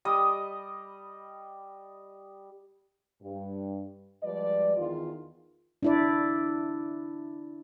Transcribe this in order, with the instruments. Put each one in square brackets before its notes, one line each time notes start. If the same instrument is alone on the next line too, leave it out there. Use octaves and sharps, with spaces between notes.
[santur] G3 D#5 D#6
[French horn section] G2
F3 G3 G#3 B4 D5
E2 D#3 F4
[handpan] D4 E4 D5